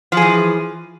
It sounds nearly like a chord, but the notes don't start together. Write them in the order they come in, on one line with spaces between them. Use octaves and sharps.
F3 G#4 E3